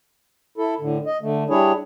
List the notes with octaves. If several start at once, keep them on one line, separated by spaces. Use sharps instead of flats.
E4 A4
A2 D3
D#5
D3 A3
G3 D4 E4 G#4 C#5